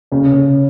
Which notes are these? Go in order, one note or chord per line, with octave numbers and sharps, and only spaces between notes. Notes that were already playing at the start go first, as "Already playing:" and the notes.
C#3 C#4
C#3